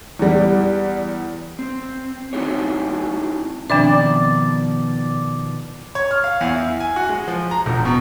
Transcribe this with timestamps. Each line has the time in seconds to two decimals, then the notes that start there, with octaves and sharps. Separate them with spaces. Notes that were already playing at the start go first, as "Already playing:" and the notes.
0.19 E2 G3
1.59 C4
2.33 C4 D#4 E4 F#4 G#4 C#5
3.70 B2 D#3 F3 C4 D4 D5 E5
5.95 C#5
6.11 F6
6.24 F5
6.41 E2
6.55 E4
6.80 G#5
6.96 F#4
7.09 G#3
7.28 F3
7.51 A#5
7.66 E1
7.85 B2